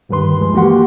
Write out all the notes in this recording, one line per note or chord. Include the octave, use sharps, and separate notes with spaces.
D2 G2 D#3 B4 C6
D#2 F3 G#3
E3 A#3 F#4 G4 F#5 C6